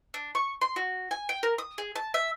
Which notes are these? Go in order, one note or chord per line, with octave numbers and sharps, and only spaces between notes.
D4
C#6
C6
F#4
G#5
G5
A#4
D#6
G#4
A5
E5